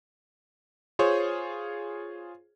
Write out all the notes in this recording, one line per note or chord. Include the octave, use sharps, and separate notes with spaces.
F4 G#4 C5 C#5